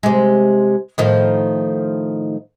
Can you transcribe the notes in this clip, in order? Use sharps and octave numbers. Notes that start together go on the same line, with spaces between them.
C3 G#3
A2 D#3 F3